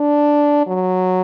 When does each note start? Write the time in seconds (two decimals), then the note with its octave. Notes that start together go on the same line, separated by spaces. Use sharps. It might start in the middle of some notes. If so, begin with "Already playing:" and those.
Already playing: D4
0.67 F#3